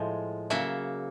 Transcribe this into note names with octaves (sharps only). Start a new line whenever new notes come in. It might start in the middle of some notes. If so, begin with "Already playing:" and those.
Already playing: A2 F3 G#3
C#3 F#3 A#3 E5